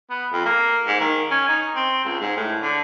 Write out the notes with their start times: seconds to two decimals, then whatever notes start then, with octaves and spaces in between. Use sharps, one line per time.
0.10 B3
0.33 F2
0.46 A#3
0.86 G#2
1.00 D#3
1.31 C#4
1.49 D#4
1.75 C4
2.05 C#2
2.21 G#2
2.37 A2
2.62 D3